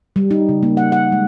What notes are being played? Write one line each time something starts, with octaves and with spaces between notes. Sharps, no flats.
G3
D#4
C#3
A#3
F#5
F#5
G#3